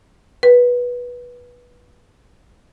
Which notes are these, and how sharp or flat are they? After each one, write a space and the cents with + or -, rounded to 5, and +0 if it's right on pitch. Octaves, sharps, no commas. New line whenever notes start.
B4 -15